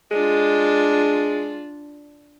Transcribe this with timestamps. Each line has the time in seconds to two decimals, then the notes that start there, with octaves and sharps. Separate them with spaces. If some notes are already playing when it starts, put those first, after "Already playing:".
0.11 G#3 D4 F4